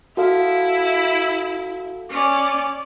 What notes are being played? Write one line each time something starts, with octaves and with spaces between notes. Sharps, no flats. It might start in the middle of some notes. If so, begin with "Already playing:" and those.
E4 F#4 A4 F5
C#4 D5